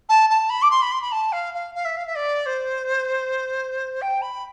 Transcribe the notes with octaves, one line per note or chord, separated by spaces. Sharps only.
A5
A5
B5
D6
C6
B5
C6
B5
A5
F5
F5
F5
E5
F5
E5
D5
C5
G5
B5